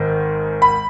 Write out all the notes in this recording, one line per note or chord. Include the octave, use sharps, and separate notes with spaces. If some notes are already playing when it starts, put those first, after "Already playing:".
Already playing: G#1 G#2 D#3
B5